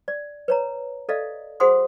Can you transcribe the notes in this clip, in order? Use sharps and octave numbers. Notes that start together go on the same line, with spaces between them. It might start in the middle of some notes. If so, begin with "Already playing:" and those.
D5
B4 C#5 A#5
A4 D5 D#5 F5
F#4 G#4 C5 F#5 C6 D#6